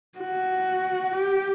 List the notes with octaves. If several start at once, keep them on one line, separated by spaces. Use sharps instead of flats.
F#4
G4